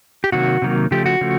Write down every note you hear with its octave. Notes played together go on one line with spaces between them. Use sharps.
G4
C3 D#3 F#3 A#3 F#4
C3 D#3 F#3 A#3
C#3 F3 A3 G4
F#4
C#3 F3 A3